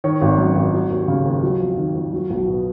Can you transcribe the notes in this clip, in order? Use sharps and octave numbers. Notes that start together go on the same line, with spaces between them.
D#3 C#5
G#1
F#2
G#1
F#3
D#2
C#3
D#2
F#3
F2
D#3
F2
F#3
B1
B2